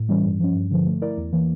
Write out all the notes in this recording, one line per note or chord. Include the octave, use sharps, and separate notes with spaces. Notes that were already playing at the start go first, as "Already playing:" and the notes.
Already playing: A2
E3 G3 C#4
G2
F3 C#4
G2
D3 F3
A3
E4 A#4 D5
E2
E3 A#3